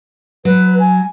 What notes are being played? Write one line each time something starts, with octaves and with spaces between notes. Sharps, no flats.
F#3 B4
G#5